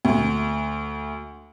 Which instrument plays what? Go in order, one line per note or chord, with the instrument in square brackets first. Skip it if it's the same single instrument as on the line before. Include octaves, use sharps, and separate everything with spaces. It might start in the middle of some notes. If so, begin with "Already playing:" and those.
[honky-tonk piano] D2